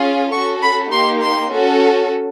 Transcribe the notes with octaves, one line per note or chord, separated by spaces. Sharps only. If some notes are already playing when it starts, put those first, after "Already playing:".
Already playing: C#4 F4 G#4
C#4 F#4 A4 C#6
B5
A#3 D#4 G4 C6
C6
C#4 F#4 A4